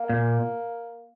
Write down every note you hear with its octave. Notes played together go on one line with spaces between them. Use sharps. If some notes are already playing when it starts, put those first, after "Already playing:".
Already playing: A#3
A#2